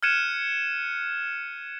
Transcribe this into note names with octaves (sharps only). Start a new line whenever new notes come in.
F6 F#6 G#6 C#7 D#7 E7